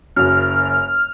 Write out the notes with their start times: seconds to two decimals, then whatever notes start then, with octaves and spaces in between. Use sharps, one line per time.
0.16 F#1 F#2 F6